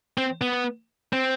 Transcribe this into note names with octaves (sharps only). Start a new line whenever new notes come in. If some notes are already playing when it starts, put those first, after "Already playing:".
C4
B3
C4